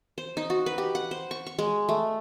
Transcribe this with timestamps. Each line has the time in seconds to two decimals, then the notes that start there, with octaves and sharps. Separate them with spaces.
0.18 C5
0.37 D#4
0.50 F#4
0.66 B4
0.78 G4
0.95 F#5
1.11 C5
1.31 C#6
1.47 C#6
1.58 G#3
1.89 A3